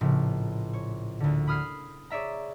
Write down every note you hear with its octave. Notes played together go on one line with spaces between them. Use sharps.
A#1 A2 C#3
C#5
D2 D3
B5 D#6 F6 G#6 C7
G#4 C#5 D5 E5 A#5